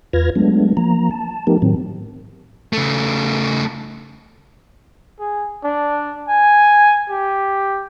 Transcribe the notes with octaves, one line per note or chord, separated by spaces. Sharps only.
E2 F4 B4 F6 G#6 A#6
F#3 G#3 A3 B3 D4
F3 A#3 A#5
A5
F3 A3 B3 D#4 G4 A#4
A2 D#3 F#3 C4
C#3 A3
G#4
D4
G#5
G4